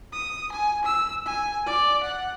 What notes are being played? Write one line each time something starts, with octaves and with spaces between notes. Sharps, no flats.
D#6
G#5
E6
G#5
D5
F#5